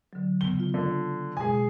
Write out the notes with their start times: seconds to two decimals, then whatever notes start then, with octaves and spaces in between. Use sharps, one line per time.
0.13 D3 F#3
0.41 C#3 B3 G7
0.56 B3 F4
0.74 D3
1.37 B2 G#3 G#4 G#5